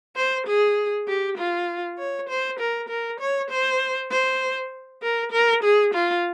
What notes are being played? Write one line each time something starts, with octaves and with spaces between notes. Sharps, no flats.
C5
G#4
G4
F4
C#5
C5
A#4
A#4
C#5
C5
C5
A#4
A#4
G#4
F4